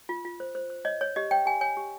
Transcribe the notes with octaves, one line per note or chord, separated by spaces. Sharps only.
F4
F4
C5
C5
C5
C#5 D#5
C#5
G4 D#5
C#5 G5
G4 G#5
C#5 G#5
G4